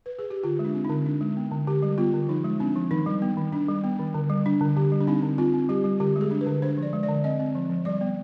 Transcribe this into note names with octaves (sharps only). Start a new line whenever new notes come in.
B4
G#4
G4
D3 F4
G#3
D4
C4
D#4
D3
D4
G#3
B3
D3
D3 G4
G3
B3 F4
D3
F3 D#4
G#3
C4 D4
F3
D#3 D#4
G3
B3
D#3
D4
G3
B3
D#3
D3
G3
D4
D3
D3 G4
G3
D4
C4 D#4
D3
C4 F4
C4
G3 G4
G3
D3 G4
G#3
G#4
D4
B4
D3
D4 C5
F3 D5
G#3
D5
D3
C4 D#5
C4
F3
F3
G3 D5
B3